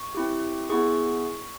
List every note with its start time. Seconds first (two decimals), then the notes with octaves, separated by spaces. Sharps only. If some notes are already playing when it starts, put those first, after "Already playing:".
Already playing: C#6
0.15 C4 E4 G4
0.69 B3 E4 G#4 C#6